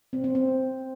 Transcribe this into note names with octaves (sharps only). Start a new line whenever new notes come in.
C4
C4
C4